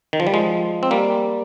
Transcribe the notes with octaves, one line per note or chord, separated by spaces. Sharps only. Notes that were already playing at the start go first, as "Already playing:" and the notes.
D#3
F3
G3
F3 G#3
C4
G3 A#3